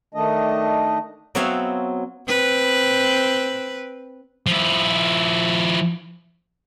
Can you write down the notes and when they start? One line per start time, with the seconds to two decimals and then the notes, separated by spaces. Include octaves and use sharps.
0.14 D#3 A3 D4 D#5
1.35 F#3 B3 C4 C#5 E5 F5
2.28 C4 B4
4.47 F3 E4